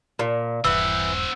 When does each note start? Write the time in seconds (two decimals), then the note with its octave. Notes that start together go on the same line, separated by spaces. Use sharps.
0.19 A#2
0.65 D#1 G2 E3 C4 F#5 E6